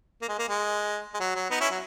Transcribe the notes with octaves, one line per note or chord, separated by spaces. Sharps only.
A#3
G#3
A#3
G#3
G#3
F#3
F#3
B3 D#4
C#4 E4
F#3